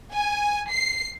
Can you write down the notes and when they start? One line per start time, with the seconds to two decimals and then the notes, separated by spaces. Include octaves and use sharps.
0.13 G#5
0.70 C7